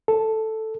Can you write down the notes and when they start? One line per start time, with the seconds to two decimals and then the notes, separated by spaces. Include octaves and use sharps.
0.08 A4